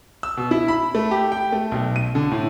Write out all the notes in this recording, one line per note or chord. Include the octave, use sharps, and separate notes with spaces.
E6
B2
E4
B5
A3
G4
G5
A3
B1
D#7
D3
A2